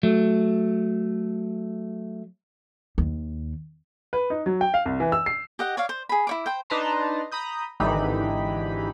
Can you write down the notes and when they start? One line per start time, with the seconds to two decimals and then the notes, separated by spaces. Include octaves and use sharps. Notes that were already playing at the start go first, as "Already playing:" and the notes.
0.03 F#3 A3
2.98 D#2
4.13 B4
4.30 D#4
4.46 F#3
4.61 G5
4.74 F5
4.86 C2
5.00 E3
5.12 E6
5.26 C7
5.59 G4 D#5 F#5
5.77 C#5 D5 F5
5.89 C5
6.09 G#4 B5
6.27 E4 C#5 D6
6.46 C5 G5
6.70 D4 D#4 B4 A5 A#5 C6
7.32 A#5 B5 D#6 G6
7.80 G#1 D3 E3 D#4 G4 B5